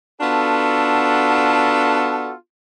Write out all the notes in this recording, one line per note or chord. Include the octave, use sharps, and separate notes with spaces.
B3 D4 F4 F#4 A4